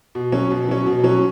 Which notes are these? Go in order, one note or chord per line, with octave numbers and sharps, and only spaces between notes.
B2
F#3 C#4
B2
F#3 C#4
B2
F#3 C#4